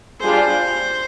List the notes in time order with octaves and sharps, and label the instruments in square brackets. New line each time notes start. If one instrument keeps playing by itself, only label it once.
[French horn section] G3 D4 F4 G#4 [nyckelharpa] C5